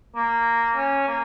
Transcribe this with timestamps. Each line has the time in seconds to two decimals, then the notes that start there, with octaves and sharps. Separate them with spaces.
0.16 A#3
0.76 C#4
1.08 A#3